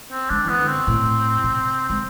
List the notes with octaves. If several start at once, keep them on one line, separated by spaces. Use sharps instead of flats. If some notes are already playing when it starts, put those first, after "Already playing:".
C4
G#3 D4
E3 B3
D3
C4
B2
A2
C3
G#3 C4